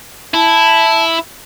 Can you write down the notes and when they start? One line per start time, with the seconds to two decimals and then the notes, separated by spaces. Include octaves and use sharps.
0.34 E4 A5